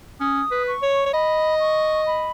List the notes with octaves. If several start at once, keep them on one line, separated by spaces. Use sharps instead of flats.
C#4 D#6
B4
C#6
C#5
C#5
D#5 B5
C#6
B5